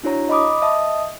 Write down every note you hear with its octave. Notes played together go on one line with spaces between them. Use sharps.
D4 E4 F#4 C#5 A#5
D#5 B5 D6 D#6
D#5 E5 A5 D#6